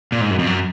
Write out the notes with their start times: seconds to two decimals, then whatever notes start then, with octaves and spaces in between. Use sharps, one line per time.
0.12 A#2
0.21 G#2
0.30 F#2
0.39 F2
0.47 F#2